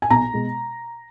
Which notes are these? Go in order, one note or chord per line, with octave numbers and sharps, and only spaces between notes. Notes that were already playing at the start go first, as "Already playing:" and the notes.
G#5
B1 A#5
B2 G#3